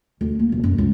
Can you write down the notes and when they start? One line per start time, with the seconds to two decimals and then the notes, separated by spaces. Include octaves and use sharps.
0.21 D2
0.39 A#3
0.52 D#1
0.64 F#2
0.78 C#2